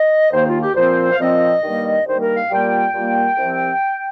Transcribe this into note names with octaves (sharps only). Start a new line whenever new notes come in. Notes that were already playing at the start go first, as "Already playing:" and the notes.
Already playing: D#5
D#2 D#3 A#3 C5
F4
G4
A#2 F3 C4 C5
F5
A#2 F3 C4 D#5
G2 D#3 G3 A#3
G2 D#3 G3 A#3 C5
A#4
F5
A#2 G3 A#3 G5
A#2 G3 A#3
C2 C3 F3 C4